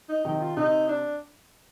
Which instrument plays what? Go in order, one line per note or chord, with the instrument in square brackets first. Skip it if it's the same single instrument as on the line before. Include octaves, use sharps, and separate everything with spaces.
[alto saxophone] D#4
[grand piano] C3 D#3 [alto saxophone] D#4
[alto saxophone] F4
[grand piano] C3 [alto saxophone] D#4
[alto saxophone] D4